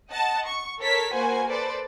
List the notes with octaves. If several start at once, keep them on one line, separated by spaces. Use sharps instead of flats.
D#5 F#5 A5
C#6
A4 A#4 C#5 B6
A#3 F#4 B4 C5 G#5
A4 B4 C5 D5